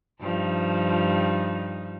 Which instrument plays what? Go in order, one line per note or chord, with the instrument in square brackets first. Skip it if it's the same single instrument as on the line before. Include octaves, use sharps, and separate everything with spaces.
[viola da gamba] G2 F3 D#4